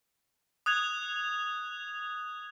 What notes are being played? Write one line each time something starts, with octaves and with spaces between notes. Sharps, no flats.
D#6 F#6 G#6 F7